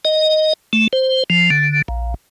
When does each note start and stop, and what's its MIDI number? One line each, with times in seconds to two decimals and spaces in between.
0.05 0.53 75
0.73 0.88 57
0.93 1.24 72
1.30 1.50 53
1.50 1.82 50
1.88 2.14 34